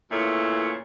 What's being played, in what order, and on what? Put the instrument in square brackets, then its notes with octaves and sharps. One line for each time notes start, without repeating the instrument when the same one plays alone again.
[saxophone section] E2 A#2 C#3 A3 E4 C#5